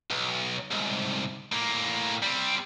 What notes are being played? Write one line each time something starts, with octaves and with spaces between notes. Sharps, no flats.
B1
C2 G#2
A2 A#3
G3 C4